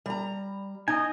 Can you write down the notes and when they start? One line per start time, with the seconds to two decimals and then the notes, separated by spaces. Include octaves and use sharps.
0.06 G3 A#5
0.88 D#4 D#5 G#5